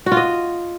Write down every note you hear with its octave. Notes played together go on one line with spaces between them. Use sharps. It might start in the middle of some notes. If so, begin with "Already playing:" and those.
F#4
F4
D#5